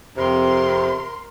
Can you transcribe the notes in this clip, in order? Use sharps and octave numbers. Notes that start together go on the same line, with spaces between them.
F2 C3 A#4 C6